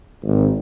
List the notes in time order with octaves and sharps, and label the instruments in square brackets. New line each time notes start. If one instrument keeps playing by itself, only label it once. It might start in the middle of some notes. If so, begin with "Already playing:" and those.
[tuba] G#1